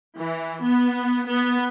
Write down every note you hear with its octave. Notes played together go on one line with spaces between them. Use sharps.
E3
B3
B3